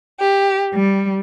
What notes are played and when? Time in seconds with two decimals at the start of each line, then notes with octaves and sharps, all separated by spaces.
0.20 G4
0.74 G3